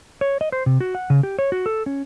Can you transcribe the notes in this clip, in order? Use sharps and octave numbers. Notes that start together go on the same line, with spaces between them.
C#5
D#5
C5
C3
F#4
F#5
C#3
G4
C#5
F#4
A4
C#4